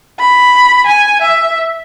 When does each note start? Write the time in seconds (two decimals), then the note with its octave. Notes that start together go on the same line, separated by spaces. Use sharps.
0.19 B5
0.86 G#5
1.21 E5